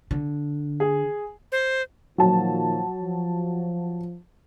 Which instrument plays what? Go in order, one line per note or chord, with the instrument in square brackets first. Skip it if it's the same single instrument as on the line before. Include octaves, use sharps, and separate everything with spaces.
[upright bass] D3
[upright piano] G#4
[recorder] C5
[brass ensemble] A#2 D#3 F3 [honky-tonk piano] F#3 A5
[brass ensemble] F3